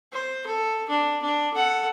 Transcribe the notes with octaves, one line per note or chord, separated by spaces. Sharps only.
C5
A4
D4
D4
A4 F#5